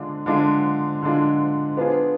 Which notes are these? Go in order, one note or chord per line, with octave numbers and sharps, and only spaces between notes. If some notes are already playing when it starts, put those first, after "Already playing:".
Already playing: D3 G#3 D4 F4
D3 G#3 D4 F4
D3 G#3 D4 F4
B3 D4 F4 G#4